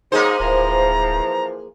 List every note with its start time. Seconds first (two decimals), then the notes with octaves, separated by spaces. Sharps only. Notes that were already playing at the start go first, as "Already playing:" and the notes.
0.12 G#2 C#3 F#3 A#3 D#4 G#4 C5
0.40 D1 E3 F3 A#5